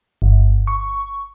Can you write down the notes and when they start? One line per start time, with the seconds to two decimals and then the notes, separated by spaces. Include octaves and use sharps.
0.22 G1
0.67 C#6